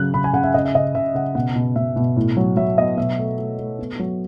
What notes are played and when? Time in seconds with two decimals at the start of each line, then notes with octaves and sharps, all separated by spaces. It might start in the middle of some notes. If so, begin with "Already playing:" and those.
Already playing: C#3 F#3 F#6
0.14 C#3 B5
0.24 G#5
0.33 C#3 F#5
0.44 E5
0.54 C#3 D#5
0.65 E5
0.75 C#3 D#5
0.95 C#3 E5
1.14 C#3 F#5
1.35 B2 F#5
1.55 B2
1.76 B2 E5
1.96 B2
2.16 A2
2.37 F#3
2.57 F#3 E5
2.77 B3 D#5
2.97 B2 E5
3.18 A3
3.38 A3
3.59 A3
3.79 B3
3.99 F#3